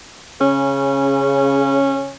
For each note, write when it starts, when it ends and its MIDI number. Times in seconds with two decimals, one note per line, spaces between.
0.41 2.09 49
0.41 2.13 61